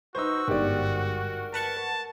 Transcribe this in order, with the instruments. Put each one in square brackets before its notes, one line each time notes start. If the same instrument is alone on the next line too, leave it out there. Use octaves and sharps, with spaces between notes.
[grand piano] D#4 B4 C5 [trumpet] F#4 [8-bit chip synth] C#6 E6
[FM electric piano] G1 G#2 [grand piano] G4 D5 [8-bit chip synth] A#4
[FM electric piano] B4 F#5 C#6 [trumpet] A5